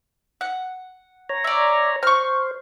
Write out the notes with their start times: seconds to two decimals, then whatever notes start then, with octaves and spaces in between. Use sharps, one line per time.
0.41 F#5
1.29 C#5 A#5
1.44 D5 E5
2.03 C5 C#6 F6